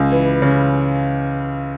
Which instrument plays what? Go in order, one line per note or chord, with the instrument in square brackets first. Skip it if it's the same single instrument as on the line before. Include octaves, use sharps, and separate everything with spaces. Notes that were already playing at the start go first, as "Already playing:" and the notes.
Already playing: [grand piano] C#2
E3
C#3